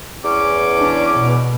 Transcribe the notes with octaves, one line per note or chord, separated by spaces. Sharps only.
E2 C#4 D6
D4
B2